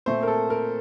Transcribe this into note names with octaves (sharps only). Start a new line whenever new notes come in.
A#2 A3 C4 C5
A#4
A4
A#4